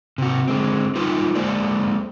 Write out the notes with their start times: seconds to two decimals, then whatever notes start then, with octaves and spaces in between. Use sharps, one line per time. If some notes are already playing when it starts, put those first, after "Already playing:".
0.18 C3 F#4
0.48 D3 G#3 C4
0.95 G3 D#4 F4 G4 B4
1.35 G#3 A#3 A4 C5 D5